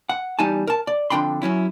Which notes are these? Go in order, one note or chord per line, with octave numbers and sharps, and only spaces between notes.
F#5
E2 G3 D#4 G#5 A5
A#4 A5
D5
F2 D3 D4 G5 B5 C6
F#2 F#3 C#4 E4